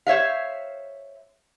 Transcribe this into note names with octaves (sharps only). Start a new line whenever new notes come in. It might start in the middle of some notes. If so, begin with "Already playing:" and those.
C5 C#5 E5 F5